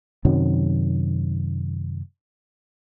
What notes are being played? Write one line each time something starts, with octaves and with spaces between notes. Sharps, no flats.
F#2 C3 D#3 F#3